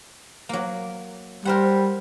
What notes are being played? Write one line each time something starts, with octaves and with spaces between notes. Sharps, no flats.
F#3 A#3
G3 A#4 C5 F#5